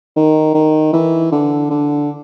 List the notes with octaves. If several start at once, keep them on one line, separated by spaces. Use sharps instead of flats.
D#3
D#3
E3
D3
D3